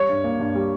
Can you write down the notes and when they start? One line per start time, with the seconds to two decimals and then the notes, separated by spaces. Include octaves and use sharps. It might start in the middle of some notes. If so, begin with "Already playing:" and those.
Already playing: G3 C#5
0.09 G2
0.24 A#3
0.40 G2
0.55 G3